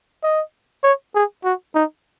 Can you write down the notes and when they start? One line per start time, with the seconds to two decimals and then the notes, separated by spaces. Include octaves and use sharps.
0.24 D#5
0.84 C#5
1.15 G#4
1.44 F#4
1.75 D#4